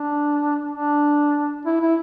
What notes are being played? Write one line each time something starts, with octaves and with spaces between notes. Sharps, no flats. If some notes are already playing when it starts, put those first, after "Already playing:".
Already playing: D4
D4
E4
E4